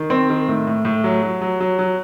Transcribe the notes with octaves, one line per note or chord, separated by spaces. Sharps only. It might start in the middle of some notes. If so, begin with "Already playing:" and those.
Already playing: D#3
C4
D#3
A2
A2
A2
F#3
F#3
F#3
F#3
F#3